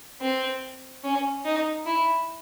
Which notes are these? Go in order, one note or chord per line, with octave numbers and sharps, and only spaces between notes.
C4
C#4
D#4
E4